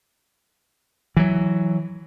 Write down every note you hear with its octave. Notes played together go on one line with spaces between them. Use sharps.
E3 F#3